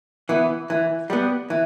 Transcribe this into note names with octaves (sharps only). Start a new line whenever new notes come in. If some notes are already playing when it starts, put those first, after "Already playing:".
E3 B3
E3
G3 B3
E3